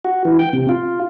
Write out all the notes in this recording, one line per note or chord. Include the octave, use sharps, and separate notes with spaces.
F#4
E3
G5
C3
F4